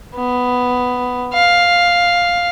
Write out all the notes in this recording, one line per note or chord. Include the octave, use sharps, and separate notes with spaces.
B3
F5